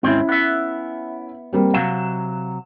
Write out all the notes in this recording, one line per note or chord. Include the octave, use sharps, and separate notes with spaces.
D#2 G#2 C4 C#4 E4
B3 E5
G3 A#3 C4
C3 F#3 F5 E7